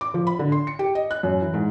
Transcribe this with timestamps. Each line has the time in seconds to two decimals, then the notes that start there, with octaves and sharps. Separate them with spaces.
0.01 D6
0.14 F3
0.27 B5
0.39 D3
0.52 C6
0.67 C#7
0.79 G4
0.95 D#5
1.11 F#6
1.23 F#2
1.41 E3
1.54 G#2